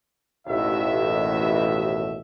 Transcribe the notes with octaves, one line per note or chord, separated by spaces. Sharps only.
A1 D#2 B2 E5